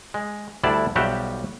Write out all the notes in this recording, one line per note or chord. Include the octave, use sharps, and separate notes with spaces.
G#3
D2 G3 D4 E4 D5 A5
B1 F3 G3 F#4 G4 E5